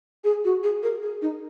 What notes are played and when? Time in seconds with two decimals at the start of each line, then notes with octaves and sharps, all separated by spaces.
0.24 G#4
0.44 F#4
0.63 G#4
0.83 A#4
1.02 G#4
1.22 D#4